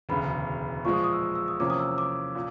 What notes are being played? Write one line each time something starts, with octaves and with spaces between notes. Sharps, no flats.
E1 D2 C#3 B5
A#2 F3 G#3 C#6
D#6
D#6
E6
E6
D#6
E2 C3 F3 A#3 C#4 D6
D#6
E6
D6
A#2